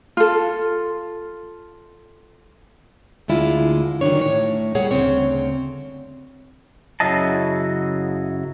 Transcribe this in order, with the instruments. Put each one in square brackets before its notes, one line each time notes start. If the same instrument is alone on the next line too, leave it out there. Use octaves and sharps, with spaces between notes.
[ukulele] F4 A4
[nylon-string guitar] D2 D3 G#3 E4 F4
D#3 F#3 A3 D4 C#5
A2 C#5
A#2 G3 G#4 C#5 F#5
D2 G#2 C#3 C4 C#5
[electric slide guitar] F#2 C#3 F#3 E4 D#5 A5